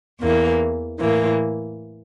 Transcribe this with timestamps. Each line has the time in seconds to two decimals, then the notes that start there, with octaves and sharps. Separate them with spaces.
0.20 E2 E3 A#3
0.99 A2 E3 A#3